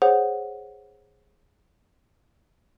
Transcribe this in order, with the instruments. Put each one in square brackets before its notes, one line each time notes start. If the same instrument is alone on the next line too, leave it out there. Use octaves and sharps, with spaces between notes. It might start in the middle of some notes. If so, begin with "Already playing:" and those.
[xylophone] G#4 C5 C#5 F#5